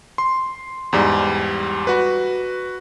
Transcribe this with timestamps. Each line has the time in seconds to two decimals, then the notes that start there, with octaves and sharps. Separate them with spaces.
0.18 C6
0.93 E2 G#2 G3
1.87 F#4 B4